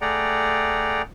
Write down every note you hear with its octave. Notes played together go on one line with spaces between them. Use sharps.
A3 G#4 D5 F#5 G5 A#5